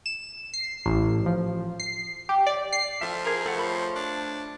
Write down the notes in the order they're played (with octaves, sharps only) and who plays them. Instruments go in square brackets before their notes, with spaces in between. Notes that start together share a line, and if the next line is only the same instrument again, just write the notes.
[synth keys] E7
C7
A1
F3
C7
G4
D5
C7
[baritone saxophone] F3 [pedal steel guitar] F4 A4 E5
[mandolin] G#4 A#4
[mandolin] A3 [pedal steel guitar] A4 F#5
[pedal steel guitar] C5 C#5 B5
[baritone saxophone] D4